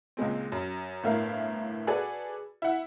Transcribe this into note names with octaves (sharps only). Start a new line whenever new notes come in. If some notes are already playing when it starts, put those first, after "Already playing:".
C#2 A#2 G#3 C4
F#2
G1 A2 E4 A#4 F5
F#4 G#4 A4 B4 D5
E4 F#5